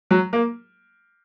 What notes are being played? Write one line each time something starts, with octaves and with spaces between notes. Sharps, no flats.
F#3
A#3